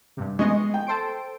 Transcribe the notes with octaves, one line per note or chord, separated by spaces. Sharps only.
G2 C3
G#3 B3 D#5 C#6
G5
A4 C5 D7